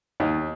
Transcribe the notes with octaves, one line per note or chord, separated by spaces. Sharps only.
D#2